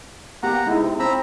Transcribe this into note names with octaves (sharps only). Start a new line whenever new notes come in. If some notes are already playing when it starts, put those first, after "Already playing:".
A#3 B3 G4 F#5 A#5
G#3 D#4 E4
C3
C4 A#5 B5 E6